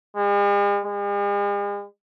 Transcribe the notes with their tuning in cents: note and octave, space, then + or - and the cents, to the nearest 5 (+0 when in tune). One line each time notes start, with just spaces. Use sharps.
G#3 -45
G#3 -45